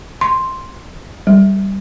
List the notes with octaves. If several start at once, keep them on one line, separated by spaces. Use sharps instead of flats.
C6
G3